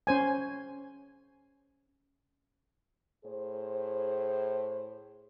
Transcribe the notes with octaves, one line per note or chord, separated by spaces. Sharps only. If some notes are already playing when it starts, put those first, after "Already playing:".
C#4 C5 G#5
A2 G#4 C5